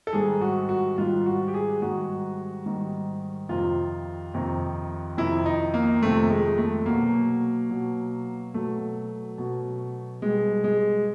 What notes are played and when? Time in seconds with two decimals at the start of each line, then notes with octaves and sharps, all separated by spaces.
0.07 A4
0.13 G#2 D#3 G3 G#4
0.41 F#4
0.69 F#4
0.98 G#2 D#3 G3 F4
1.26 F#4
1.48 G4
1.54 G#4
1.82 G#2 D#3 G3 F#4
2.66 G#2 D#3 G3
3.49 F2 C3 D#3 F4
4.34 F2 C3 D#3
5.17 F2 C3 D#3 E4
5.46 D#4
5.74 A#3
6.02 F2 C3 D#3 A3
6.30 G#3
6.58 A3
6.85 B2 F#3 A#3
7.70 B2 F#3
8.54 B2 F#3 A3
9.38 B2 F#3
10.22 B2 G3 G#3
10.64 G#3